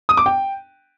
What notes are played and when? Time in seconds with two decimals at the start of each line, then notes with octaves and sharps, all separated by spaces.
0.09 D#6
0.17 D6
0.26 G5